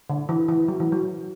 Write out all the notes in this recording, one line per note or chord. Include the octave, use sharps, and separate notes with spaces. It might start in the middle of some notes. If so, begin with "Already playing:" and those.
D3
E3
E3
F#3
E3
F#3